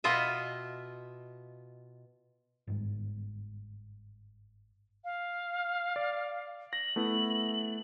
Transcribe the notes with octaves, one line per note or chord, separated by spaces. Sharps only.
B2 F4 D#5 E5
G1 G#2
F5
D5
A#6 F#7
A3 B3 E4